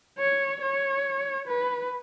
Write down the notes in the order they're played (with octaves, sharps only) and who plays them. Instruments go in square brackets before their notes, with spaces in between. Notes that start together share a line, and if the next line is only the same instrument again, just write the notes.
[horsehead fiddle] C#5
C#5
B4